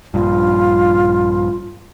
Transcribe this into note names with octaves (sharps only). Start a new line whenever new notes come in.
A#1 G2 F4